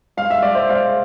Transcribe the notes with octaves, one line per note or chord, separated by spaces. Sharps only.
G#3 F5
E5
G#3 D5
C5 E5
G#3 D5 F5